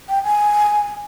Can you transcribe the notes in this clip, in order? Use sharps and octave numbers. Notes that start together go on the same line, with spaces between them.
G5
G#5